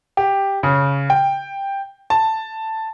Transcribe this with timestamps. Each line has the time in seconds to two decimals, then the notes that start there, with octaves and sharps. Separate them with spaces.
0.17 G4
0.63 C#3
1.10 G5
2.10 A5